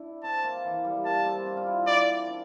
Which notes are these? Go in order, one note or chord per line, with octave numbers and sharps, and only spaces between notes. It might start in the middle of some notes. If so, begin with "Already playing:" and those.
Already playing: D4 E4
C4 A5
A#3
E3
G3
A#3 A5
C4
D4
F4
E4
E4 D5
D4